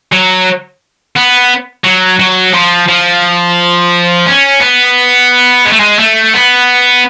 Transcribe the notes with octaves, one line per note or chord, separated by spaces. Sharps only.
F#3
B3
F#3
F#3
F3
F3
C#4
B3
G#3
A3
G#3
A3
B3